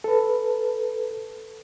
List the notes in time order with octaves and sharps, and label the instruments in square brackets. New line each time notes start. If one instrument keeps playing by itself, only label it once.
[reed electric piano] A4 B4